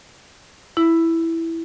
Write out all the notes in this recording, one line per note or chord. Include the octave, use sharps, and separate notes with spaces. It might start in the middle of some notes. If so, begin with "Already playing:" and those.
E4